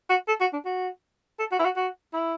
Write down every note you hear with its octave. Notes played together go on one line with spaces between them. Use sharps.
F#4
A4
F#4
D4
F#4
A4
F#4
E4
F#4
F#4
E4